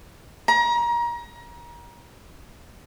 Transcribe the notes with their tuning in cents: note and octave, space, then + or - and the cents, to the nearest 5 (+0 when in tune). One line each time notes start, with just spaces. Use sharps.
A#5 +30